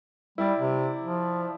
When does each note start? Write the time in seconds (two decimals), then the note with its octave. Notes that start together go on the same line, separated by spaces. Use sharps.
0.38 G3 E4 D5
0.59 C3
1.02 F3